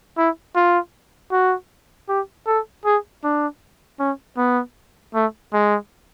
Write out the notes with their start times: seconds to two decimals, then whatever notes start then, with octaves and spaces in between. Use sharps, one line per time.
0.18 E4
0.56 F4
1.32 F#4
2.09 G4
2.47 A4
2.85 G#4
3.24 D4
3.99 C#4
4.37 B3
5.14 A3
5.53 G#3